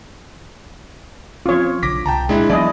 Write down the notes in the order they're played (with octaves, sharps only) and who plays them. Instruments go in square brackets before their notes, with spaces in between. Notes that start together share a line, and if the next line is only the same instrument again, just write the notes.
[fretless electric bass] F3 C4 C#4 [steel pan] F4 C#5
[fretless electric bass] B1 D3 [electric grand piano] D6 A#6 B6
[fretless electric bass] C2 [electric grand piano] G5 A5 A#5
[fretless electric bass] A#2 [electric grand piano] G#3 D4 E4
[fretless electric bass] E3 F#3 B3 [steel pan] E4 D#5 [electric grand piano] D5